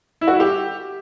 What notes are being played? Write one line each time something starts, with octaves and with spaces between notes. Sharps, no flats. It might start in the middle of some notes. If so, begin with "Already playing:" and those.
E4
F#4
E4
G4